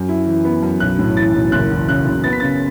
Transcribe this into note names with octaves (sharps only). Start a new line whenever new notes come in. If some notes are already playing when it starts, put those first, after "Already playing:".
Already playing: F#2
E4
E3
B3
F#2
B1 F#6
A2
E3 A6
B1
F#1 F#6
E2
C#3 F#6
F#1
B3 A6
B6
C#3 A6